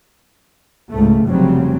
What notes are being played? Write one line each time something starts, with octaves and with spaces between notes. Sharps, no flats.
C#2 G#2 A3
F1 C#3 F#3 G3 C4